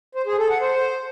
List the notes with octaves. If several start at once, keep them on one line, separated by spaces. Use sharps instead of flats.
C5
G#4
A4
F#5
C5